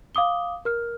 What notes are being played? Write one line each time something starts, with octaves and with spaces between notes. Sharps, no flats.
F5 D6 D#6 G7
A#4 F6